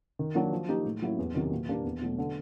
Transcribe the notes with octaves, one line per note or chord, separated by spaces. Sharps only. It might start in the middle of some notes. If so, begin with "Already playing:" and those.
D#3
F#3 A#3 D4
F3
A#3 D#4 G4
A2
F#3 A#3 C#4 E4
E2
C3 D#3 F#3
A#2
G3 A#3 D4
E2
B2 F#3 A3
D3